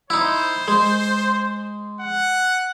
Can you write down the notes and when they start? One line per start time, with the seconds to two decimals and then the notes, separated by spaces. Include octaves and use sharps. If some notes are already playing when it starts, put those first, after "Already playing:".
0.10 D#4 E4 C5
0.68 G#3
2.01 F#5